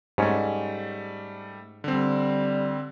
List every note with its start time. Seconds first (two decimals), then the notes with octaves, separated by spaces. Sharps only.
0.18 G#2 G3 A3 C#4
1.84 D3 G3 C4